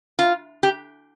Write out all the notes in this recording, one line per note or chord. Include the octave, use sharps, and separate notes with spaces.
F4
G4